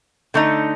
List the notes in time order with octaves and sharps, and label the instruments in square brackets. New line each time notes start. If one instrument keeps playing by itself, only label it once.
[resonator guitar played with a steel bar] D3 A3 D#4